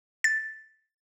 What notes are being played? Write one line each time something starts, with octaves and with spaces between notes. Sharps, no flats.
A6